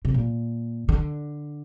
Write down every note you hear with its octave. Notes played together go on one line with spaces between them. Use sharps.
C3
A#2
D3